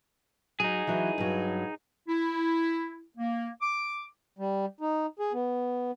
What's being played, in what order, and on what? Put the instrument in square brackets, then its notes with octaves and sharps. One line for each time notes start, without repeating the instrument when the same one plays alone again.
[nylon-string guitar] F#3 [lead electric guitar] D#4 G#4
[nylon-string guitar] E3 F#3
G2 F#3
[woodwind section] E4
A#3
D6
[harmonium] G3
D#4
G#4
B3